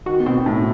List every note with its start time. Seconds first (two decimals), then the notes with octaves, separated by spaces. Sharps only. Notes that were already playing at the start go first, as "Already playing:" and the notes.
0.06 D#3 F#4
0.20 B3
0.26 B2 C4
0.46 A2 D#4